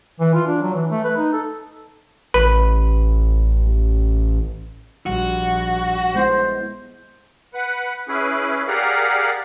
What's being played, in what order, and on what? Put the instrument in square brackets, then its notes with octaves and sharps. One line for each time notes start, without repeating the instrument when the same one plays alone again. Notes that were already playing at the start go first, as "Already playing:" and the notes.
[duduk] E3
F4
D4
F#3
E3
A3
B4
D#4
A4
[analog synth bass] A1 [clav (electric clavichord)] B4
[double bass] A#1 [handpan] G3 [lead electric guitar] F#4
[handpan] G#3 B3 E4 [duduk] C5
[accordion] B4 F#5
C#4 E4 G#4 B4
G4 G#4 A#4 D5 F5 F#5